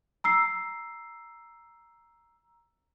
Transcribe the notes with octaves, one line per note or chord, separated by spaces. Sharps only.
A#5 E6 C7